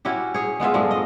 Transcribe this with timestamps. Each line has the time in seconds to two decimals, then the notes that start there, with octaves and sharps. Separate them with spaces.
0.05 C#4 E4 F#4 G4
0.34 G#4 C#5
0.60 G#3 B3 F4 E5
0.74 G2 F3 G#3 A3
0.91 D#5